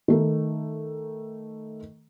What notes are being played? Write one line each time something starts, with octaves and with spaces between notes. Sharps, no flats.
D#3 A3